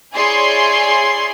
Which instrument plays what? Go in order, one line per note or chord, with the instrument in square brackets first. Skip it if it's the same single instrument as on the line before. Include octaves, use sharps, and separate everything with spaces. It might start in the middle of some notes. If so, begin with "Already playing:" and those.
[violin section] E4 G#4 C#5 D5 G#5 C6